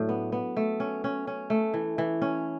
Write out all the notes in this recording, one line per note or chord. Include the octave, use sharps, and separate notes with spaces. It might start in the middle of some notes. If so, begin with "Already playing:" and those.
Already playing: A2 F#3 D4
B3
B3
A3
C#4
C#4
C#4
A3
E3
E3
C#4